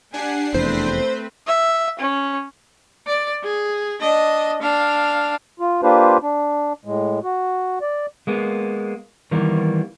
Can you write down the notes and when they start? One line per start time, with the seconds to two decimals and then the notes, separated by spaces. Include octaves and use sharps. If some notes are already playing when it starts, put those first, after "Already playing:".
0.14 D4 G4 F#5 G#5 C7
0.54 F1 E2 A3 C4 B4 C5
1.47 E5
1.99 C#4
3.07 D5
3.43 G#4
4.01 D4 D#5
4.62 D4 F5
5.60 F4
5.83 A#3 D4 F4 G4 B4 C5
6.22 D4
6.85 A2 G#3
7.23 F#4
7.82 D5
8.27 G#3 A#3 B3
9.31 D#3 E3 G3 A#3 B3